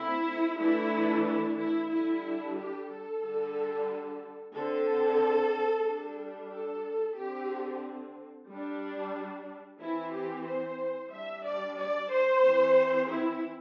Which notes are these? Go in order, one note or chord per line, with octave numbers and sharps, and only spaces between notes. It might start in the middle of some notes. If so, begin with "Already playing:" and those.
Already playing: D3 A3 C4 E4
E3 A3 D4 E4
E4
E4
D3 G3 D4 E4
G4
A4
D3 G3 D4
D3 C4 A4
G3 D4
A4
D3 C4 G4
G3 D4
E3 C4 E4
G4
C5
G3 D4 E5
D5
D5
C5
E3 C4
E4